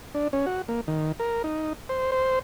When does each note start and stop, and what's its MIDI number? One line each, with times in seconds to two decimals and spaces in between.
0.15 0.28 62
0.33 0.46 61
0.46 0.62 66
0.68 0.81 58
0.88 1.12 51
1.20 1.42 70
1.44 1.73 63
1.89 2.12 72
2.12 2.39 72